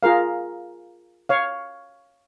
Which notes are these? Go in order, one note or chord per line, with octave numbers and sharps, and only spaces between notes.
F4 G#4 A#4 F5
C#5 F5